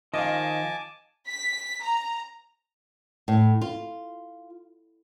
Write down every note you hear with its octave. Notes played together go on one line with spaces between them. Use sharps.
D#3 F3 D#5 F5 G#5 A5 D6
B6
A#5
A2
F4